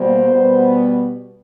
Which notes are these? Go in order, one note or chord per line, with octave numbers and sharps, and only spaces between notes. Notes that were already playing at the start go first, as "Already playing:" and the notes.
Already playing: B2 G3 A#3 C5
B2 G3 B3